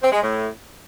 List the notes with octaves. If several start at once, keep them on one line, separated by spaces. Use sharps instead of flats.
C4
G#3
A2